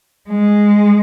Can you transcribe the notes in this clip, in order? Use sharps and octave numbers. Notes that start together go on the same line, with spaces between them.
G#3